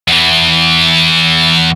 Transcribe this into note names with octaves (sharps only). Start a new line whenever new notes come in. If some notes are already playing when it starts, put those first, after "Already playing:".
E2 E3